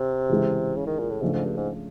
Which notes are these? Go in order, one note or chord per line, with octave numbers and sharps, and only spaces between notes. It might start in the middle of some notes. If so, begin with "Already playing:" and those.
Already playing: C3
C#3 E3 G#3
C#3
D#3
A#2
A2
G#2 C#3 F3 A3 D4
G#2
G2
G#2